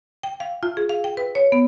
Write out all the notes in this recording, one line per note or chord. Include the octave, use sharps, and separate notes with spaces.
G5
F5
F4
G#4
F5
G5
B4
C#5
B3